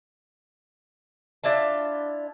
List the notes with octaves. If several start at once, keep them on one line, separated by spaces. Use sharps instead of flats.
D4 E4 F4 A5